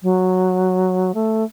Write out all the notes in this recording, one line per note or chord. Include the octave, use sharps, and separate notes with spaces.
F#3
A3